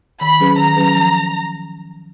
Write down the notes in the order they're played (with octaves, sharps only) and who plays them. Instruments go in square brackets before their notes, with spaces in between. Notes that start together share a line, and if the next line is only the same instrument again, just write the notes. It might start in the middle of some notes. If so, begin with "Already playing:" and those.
[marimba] D#3 [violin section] B5
[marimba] F#3 C#4 G#4 B4
[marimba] D#3 [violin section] A#5
[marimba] F#3 C#4 G#4 B4
F3